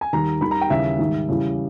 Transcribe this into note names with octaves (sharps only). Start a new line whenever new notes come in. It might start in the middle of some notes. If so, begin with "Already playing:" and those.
G#5
D#2 D#3 G3 A#5
D#2 D#3 G3 B5
A#5
G5
D#2 C#3 E3 G3 E5
G#2 D#3 G3
E2 C#3 E3 G3